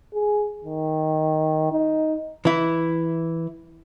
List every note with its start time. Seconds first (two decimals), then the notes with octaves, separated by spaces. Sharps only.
0.13 G#4
0.64 D#3
1.72 D#4
2.45 E3 E4